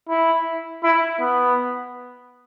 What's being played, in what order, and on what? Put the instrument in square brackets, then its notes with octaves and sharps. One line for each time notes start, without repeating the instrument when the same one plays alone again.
[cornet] E4
E4
B3